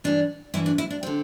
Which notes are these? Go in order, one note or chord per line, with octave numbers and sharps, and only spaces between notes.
G2 E3 D4
G2 E3 E4
D4
E4
D4
D3 C4